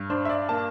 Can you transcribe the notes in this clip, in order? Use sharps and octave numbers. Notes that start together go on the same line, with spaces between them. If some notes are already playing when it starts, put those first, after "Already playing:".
Already playing: G2
D4 C5
E5
D5
A#3 A5